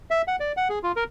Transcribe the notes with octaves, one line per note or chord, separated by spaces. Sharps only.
E5
F#5
D5
F#5
G#4
F4
A#4